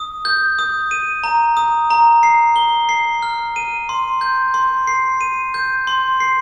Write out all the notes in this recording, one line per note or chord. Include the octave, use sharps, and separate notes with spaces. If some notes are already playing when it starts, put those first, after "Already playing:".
Already playing: D#6
G6
D#6
D#7
A#5
D#6
A#5
C7
G7
C7
F6
D#7
C6
G6
C6
C7
D#7
G6
C6
C7